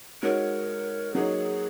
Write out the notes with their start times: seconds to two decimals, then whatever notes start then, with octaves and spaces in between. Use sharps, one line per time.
0.23 G#3 D#4 F#4 A#4 C#5
1.15 F#3 A#3 D#4 F#4 G#4 C#5